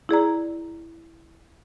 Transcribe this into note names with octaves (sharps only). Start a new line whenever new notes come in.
E4 G#4 D5 A#5